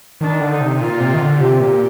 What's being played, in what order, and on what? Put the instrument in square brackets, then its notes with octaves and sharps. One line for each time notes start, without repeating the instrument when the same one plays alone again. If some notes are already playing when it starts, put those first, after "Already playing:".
[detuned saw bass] D#3 [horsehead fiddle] D4
[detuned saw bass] D3
[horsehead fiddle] D#4
[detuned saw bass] C3
[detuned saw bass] A#2 [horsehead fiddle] F4
[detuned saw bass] C3
D#3
D3
[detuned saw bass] C3 [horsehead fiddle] G4
[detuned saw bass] A#2